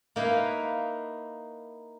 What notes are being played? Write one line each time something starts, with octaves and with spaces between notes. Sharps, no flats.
A#3 D#4 E4 B4 F5